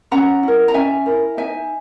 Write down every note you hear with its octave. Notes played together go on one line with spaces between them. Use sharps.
C#4 F#5 A#5
E4 A#4
A#5
C#4 E5 G#5
E4 A#4
D#4 E5 G#5